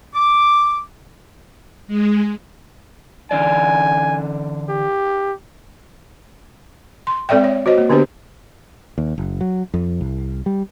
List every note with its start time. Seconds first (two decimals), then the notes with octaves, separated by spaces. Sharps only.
0.14 D6
1.87 G#3
3.31 D3 E3 D5 G#5
4.69 G4
7.07 C6
7.29 G#3 C4 A4 D5 E5 G5
7.44 C#5
7.66 F#4 C5 C#5 D#5
7.78 A#3
7.89 D3 B3 D4 G4 B4 C5
8.98 D#2
9.18 F#1
9.41 F#3
9.74 F2
10.01 C2
10.46 G3